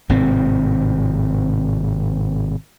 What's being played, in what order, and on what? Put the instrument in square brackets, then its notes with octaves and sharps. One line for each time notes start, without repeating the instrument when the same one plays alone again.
[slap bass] G#1 A2 C3 C4